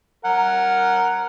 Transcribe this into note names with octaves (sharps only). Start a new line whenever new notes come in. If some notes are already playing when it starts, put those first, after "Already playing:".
A#4 F#5